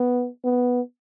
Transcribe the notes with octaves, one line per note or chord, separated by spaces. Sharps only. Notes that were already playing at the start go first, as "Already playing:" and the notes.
Already playing: B3
B3